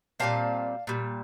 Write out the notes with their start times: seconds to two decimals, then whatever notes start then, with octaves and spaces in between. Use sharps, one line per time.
0.20 A#2 G3 C4 F5 A5
0.87 A#2 G3